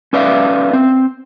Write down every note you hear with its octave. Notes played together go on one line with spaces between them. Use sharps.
C#4 B4 D5 E5 F5
C4